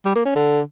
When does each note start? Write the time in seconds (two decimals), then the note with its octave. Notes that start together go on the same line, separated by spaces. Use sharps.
0.05 G3
0.15 A#3
0.25 C#4
0.35 D3